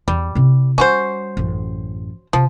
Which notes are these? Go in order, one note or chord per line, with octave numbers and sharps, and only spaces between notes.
E2 G3
C3 E4
G3 C#4 F#4 C5
A1 F#2
C3 F3